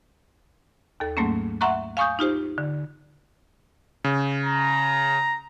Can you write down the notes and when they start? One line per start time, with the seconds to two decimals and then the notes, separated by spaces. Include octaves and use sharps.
1.00 D#2 A4
1.17 G#2 F#3 A3 A#3 C#4
1.61 E5 F#5 A#5 C6 C#6 F#6
1.97 F5 G#5 C#6 D#6 G6
2.19 D#4 F4 G4 C5
2.58 D3
4.04 C#3
4.46 A#5